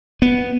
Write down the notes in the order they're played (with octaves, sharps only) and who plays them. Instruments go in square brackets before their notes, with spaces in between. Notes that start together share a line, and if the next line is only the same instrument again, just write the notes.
[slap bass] B3